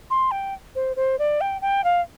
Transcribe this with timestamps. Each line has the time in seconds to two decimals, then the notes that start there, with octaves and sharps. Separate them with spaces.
0.10 C6
0.31 G5
0.75 C5
0.96 C5
1.19 D5
1.41 G5
1.61 G5
1.84 F5